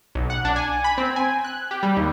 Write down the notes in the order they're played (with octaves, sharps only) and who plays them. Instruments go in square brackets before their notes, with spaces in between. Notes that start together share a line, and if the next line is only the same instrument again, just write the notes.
[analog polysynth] B1
F#5
D4
G#5
B5
C4
G#5
F#6
G4
G3
D#2